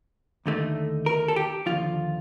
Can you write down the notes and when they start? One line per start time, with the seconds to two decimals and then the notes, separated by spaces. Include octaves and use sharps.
0.46 D#2 D3 A3 D#4
1.06 A#4
1.28 A4
1.36 G4
1.66 D#2 D3 F3 F4